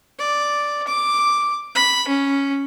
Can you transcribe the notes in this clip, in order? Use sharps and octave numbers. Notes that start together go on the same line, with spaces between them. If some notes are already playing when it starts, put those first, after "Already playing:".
D5
D6
B5
C#4